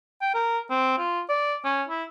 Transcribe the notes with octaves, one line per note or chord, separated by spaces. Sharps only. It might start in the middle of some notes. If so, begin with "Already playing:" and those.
G5
A#4
C4
F4
D5
C#4
E4